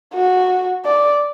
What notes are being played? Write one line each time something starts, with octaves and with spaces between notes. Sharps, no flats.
F#4
D5